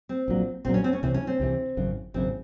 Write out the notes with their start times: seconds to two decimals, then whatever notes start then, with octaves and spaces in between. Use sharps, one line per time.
0.09 C4
0.28 A#1 A#2 F#3
0.65 A#1 A#2 F#3 C4
0.74 C#4
0.84 C4
0.93 C#4
1.03 C2 C3 E3 C4
1.14 C#4
1.27 C4
1.40 C2 C3 E3
1.77 G#1 F#2 C#3
2.14 G#1 F#2 C#3 C4